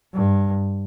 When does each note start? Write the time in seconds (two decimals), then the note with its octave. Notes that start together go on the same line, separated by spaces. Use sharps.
0.14 G2